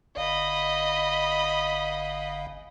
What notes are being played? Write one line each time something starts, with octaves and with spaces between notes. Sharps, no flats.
G1 D#5 F5 B5